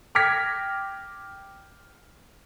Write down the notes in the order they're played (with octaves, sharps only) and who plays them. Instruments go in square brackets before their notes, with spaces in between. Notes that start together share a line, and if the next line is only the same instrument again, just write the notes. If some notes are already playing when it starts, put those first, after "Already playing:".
[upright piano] G5 D6 F6 G#6 A#6 B6